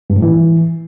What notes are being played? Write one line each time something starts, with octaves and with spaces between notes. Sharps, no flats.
G2
A2
E3